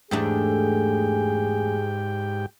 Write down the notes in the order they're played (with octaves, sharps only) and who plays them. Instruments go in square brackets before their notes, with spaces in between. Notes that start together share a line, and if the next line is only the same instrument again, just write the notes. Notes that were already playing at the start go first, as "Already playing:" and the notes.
[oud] E2 A3 D4 [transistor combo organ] G#2 G4 G5 [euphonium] G#4